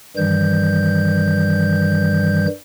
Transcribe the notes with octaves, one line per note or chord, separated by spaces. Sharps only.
G2 D#3 E3 G3 G6